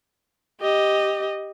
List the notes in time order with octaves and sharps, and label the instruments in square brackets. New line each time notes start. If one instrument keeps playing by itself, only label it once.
[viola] G4 D#5